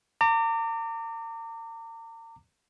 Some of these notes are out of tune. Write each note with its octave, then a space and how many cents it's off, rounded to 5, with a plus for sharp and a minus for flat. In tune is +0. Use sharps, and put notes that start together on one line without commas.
A#5 -40 D6 +0